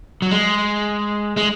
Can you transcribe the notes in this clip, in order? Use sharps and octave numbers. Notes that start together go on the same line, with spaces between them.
F#3
G#3
G#3